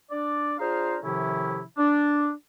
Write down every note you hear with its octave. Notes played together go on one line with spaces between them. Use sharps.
D4 D5
D4 F4 G#4 C5 F5 A#5
A2 C3 D#3 F3 C#4 E4
D4